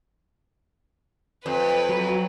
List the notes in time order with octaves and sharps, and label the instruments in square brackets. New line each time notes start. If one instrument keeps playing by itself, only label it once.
[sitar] F2 [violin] B4
[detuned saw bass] F#3